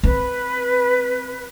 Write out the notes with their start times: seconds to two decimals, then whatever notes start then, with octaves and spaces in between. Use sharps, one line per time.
0.03 C4 B4